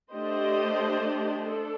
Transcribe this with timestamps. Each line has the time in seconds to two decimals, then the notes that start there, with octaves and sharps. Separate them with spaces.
0.11 A3 D4 G4 C5 D#5
1.47 D4 A4